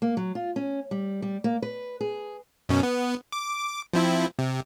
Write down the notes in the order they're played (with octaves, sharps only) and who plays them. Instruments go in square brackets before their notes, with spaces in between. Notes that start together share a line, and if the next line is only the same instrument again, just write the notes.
[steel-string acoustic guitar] A#3
F#3
F4
C#4
G3
G3
A#3
B4
G#4
[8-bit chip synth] F#2 B2 C#4
B3
D6
F3 C4 E4
C3